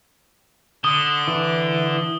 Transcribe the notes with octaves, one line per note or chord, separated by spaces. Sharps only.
D3 D#6 G7
E3